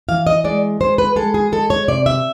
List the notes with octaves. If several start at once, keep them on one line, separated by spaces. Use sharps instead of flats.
E3 F5
D#5
G#3 D5
G#3 C5
B4
G#3 A4
G#4
G#3 A4
C#5
C3 D5
E5